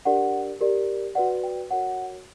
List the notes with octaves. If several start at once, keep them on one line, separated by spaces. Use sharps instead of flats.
D4 G4 A#4 D5 F#5
G4 A#4 D5
F#4 B4 D5 F#5
G5
F#4 A#4 C#5 F#5